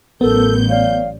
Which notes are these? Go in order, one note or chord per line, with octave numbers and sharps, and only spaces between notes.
A1 F#3 B3 A4 A#4 G6
C#5 D5 F5